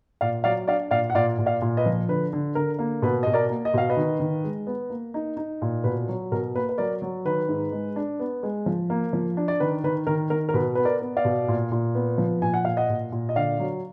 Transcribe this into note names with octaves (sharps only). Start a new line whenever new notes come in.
A#2 D5 F5
F#3 D5 F5
D4 D5 F5
A#2 D5 F5
F#5
A#2 D5 F5
A#2
D5 F5
A#2
B4 D#5
F3
D3 B4
D3
D3 A#4
A#3
B2 B4
B2 D#5
A#4 D5
A#3
D#5
B2 F5
B4 D#5
D#3
D#3
G#3
B3
A#3
D#4
D#4
A#2
B2 B4
F#3
B2 A#4
A#3 B4
B4
F#3 A#4 D5
F#3
D#3 B4
G#2
G#3
D4
B3
G#3
F3
A#3
F3
D4
D5
D#3 B4
D#3 B4
D#3 A#4
D#3 A#4
A#4
B2 B4
B3 B4
A#4 D5
B3
D5 F5
B2
A#2
A#2
B3
F3
A#2 G#5
F#5
A#2 F5
D#5 F#5
A#2
A#2
D#5
D3 D5 F5
F#3